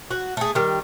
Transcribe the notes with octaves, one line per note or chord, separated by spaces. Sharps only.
F#4
A3 G#4
D#3 G3